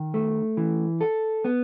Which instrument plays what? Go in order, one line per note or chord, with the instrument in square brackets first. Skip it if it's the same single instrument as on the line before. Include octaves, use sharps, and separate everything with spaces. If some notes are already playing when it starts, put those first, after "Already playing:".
Already playing: [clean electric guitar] D#3
A3
E3
A4
B3